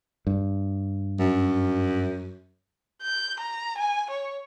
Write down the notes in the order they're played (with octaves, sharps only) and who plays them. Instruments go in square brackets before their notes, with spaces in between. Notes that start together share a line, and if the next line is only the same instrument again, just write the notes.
[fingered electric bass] G2
[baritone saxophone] F#2
[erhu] G6
A#5
G#5
C#5